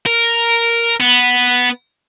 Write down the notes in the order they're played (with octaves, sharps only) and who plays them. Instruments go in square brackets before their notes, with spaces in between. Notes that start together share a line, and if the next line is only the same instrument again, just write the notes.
[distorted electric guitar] A#4
B3